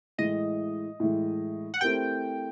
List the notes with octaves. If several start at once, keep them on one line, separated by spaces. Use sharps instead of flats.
A2 E3 G#3 D#5
A2 E3 G#3
F#5
A3 C4 E4 G4 A#4 G5